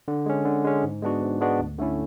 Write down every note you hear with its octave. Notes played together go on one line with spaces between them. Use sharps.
D3
G#3 C#4
D3
G#3 C#4
G#2
G#3 B3 D4 F#4
G#2
G#3 B3 D4 F#4
D2
D3 A3 C#4 E4